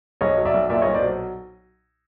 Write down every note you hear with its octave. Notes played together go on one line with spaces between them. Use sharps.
B1 C#5 D#5
F#3
D5 E5
B1
A#2 D5 E5
C#5 D#5
B1
C5 D5
F#3